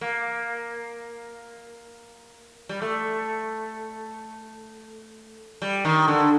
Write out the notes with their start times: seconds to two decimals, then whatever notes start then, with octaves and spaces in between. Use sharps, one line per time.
0.01 A#3
2.69 G3
2.82 A3
5.62 G3
5.85 D#3
6.08 D3